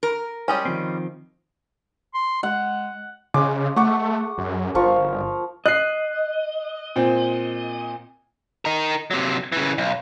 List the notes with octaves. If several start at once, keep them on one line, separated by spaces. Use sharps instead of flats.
A#4
G3 G#3 C#4
D#3 F3 C4
C6
G#3 F#5
C#3 G#3 D6
A3 F#5 C#6 D6
F#2
G1 F3 A#4 C#6
D#5 F#6 C7
A#2 C4
D#4 A#4
C3 F#3
C#3 E3
B1